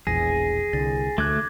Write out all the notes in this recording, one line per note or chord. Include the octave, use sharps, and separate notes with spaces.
E1 A#1 E2 G#4 A#6
C2 D3 A6
D2 A3 D6 F#6 G#6